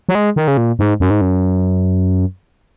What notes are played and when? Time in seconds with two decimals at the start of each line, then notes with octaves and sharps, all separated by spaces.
0.09 F#3
0.15 G#3
0.36 D#3
0.48 C#3
0.57 A#2
0.79 G#2
1.00 F#2
1.10 G#2
1.21 F#2